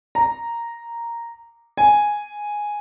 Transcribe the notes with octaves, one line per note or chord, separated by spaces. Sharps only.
A#5
G#5